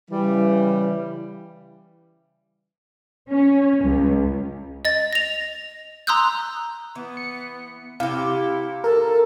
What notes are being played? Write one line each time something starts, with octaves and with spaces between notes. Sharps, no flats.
C#3 E3 G3
C#4
C#2
D#5 A6
A#6 F7
A#5 C6 D#6 E6 F#6 G6
E3 B3
C#7
C3 E4 G4 F5
A4 A#4